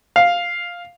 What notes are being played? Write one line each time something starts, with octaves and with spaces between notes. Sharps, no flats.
F5